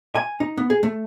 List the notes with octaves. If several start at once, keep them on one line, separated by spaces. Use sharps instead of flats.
G#5
D#4
B3
G#4
A3